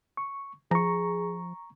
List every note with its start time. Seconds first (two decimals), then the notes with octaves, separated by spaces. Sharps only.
0.17 C#6
0.71 F3 G#4 A#5 C#6